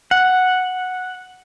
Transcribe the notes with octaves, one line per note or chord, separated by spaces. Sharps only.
F#5